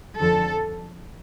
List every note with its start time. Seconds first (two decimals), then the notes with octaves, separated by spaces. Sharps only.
0.19 F2 D3 F3 A4